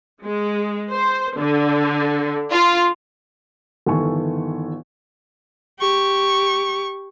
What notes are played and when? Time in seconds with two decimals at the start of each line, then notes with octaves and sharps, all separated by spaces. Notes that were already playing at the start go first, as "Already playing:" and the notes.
0.23 G#3
0.91 C5
1.38 D3
2.52 F4
3.86 G1 D#3 E3 A4 G#5 C#6
5.79 G4 C#6